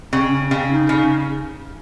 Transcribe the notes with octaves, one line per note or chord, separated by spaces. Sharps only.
C#3 C4
C#4
C#3 C4
D#4
C#3